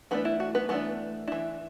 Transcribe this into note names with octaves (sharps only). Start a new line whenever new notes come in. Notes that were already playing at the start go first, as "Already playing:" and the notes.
E3 A3 B3 D4 B4
E4
F#4
B3 B4
E3 A3 B3 D4 B4
E3 D4 E4